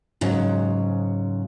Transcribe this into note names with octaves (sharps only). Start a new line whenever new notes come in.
G#2 C#3 F#3